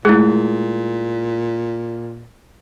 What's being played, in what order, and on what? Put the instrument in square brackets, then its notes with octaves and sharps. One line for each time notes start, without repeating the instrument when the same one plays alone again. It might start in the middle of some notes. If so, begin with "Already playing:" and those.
[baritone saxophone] A#2 [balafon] G#3 A3 [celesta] E4 G#4